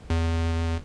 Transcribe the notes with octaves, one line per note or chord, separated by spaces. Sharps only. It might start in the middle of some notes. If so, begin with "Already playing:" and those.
E2